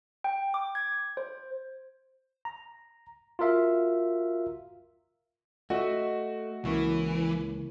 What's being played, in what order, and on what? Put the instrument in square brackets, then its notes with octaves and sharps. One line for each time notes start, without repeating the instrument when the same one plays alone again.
[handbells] G5
D6
G#6
C5
[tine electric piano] A#5
F4 F#4 A#4 E5 F5
[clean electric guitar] A3 [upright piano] F#4 [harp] D#5 E5
[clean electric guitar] C#2 [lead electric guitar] E3 [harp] A#3 C#4 E4